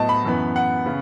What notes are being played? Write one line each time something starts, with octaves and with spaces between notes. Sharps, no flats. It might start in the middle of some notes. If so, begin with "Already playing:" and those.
Already playing: A2 F#3 B3 D#5 A5
B5
F#2 E3 B3
F#5
C#3 B3